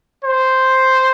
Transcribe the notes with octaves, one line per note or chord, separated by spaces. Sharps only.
C5